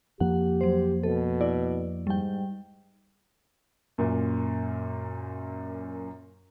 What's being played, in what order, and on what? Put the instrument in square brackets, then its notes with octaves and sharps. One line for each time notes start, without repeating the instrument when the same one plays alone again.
[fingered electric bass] F2 F3 A#3 [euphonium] G4 [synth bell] F#5
[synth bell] F#3 C5
[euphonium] B2 [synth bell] A4
[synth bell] E4 D5
[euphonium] G#2 [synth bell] G3 G5
[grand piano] F#2 A#2